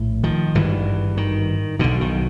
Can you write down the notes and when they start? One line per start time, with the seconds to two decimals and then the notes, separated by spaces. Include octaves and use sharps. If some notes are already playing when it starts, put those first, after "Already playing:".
Already playing: A#1 A2
0.24 D#3 F3
0.55 G#1 G2 D3 E3
1.17 D#3
1.79 B1 B2 D3
2.01 D#3